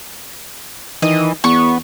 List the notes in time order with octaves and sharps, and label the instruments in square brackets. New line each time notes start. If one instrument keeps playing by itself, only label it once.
[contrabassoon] D#3 [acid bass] E3 [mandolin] D#5
[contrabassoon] E2 [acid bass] B3 [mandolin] C#6